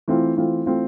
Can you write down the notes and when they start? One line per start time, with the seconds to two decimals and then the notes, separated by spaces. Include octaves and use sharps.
0.08 E3 A3 C4 F4
0.37 E3 A3 C4 F4
0.66 E3 A3 C4 F4